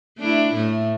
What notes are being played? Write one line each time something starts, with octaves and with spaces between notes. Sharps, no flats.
A3 D4 E4
A2 A3